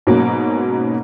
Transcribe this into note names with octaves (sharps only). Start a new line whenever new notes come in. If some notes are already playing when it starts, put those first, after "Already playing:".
G#2 B2 F#3 A#3 C#4